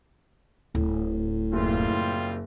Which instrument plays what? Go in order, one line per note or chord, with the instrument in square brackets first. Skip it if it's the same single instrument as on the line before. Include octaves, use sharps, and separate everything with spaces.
[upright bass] D1 [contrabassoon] A2
[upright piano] F#1 [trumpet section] G3 C4 F4